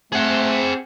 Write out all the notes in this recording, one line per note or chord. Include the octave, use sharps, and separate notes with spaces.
A3 C4 G#4 F#5